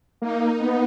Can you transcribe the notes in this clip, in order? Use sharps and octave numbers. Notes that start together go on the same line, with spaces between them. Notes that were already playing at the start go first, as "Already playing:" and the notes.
A#3 D#4
B3